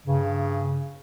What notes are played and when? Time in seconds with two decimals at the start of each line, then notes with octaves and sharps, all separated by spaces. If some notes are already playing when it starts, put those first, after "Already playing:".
0.07 G2 C#3